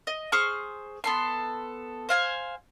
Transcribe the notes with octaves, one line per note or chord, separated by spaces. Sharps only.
D#5
G#4 C5 C#6 F6
B3 A4 C6
C5 F5 G#5